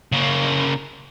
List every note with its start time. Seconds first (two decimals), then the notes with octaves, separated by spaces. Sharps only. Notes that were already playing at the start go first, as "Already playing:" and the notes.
0.12 C#3 A#3